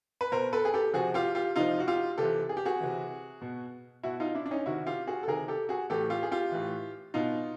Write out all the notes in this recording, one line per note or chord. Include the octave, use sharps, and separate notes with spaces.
B4
B2 A#4 C5
A4 B4
G#4
G4 A4
C3 F3 F#4 G#4
F4 G4
F4 G4
C3 F3 D#4 F4
F#4
F4 G4
C3 E3 G4 A4
G#4
G4
F#4 G#4
C3 E3
B2
B2 E4 F#4
D#4 F4
D4 E4
D4
C#4 D#4
C3 D#3 E4 F#4
F4 G4
F#4 G#4
A4
C3 D#3 G#4 A#4
G4 A4
F#4 G#4
A2 E3 G4 A4
F4 G4
G#4
F4 G4
A2 E3
B2 D#4 F4